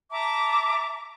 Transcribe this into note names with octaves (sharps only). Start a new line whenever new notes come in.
E5 A5 A#5 D6